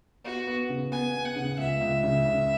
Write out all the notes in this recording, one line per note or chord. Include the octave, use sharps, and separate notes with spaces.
B3 F#4
B3
C#3
B3 G#5
B3
F#5
C#3
C#2 E5
C#2
C#3
C#3